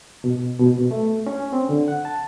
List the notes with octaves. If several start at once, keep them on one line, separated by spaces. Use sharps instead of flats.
B2
B2
B2
A3
C#4
C4
D3
F#5
A5